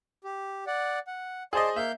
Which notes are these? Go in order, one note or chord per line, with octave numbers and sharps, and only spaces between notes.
G4
D5 F#5
F#5
G#4 C5 D5 D#5 A5 C6
A#3 E5 F5 G6